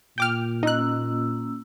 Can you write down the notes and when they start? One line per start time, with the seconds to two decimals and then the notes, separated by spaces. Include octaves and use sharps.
0.18 A#2 G5 D6 F6
0.63 A#3 C#4 D#4 E6 F#6